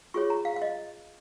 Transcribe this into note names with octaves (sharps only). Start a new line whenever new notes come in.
F4 G#4 C#5 C#6
A#5
F5
F5
D#5